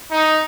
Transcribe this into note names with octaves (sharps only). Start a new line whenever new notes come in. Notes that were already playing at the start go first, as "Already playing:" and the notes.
D#4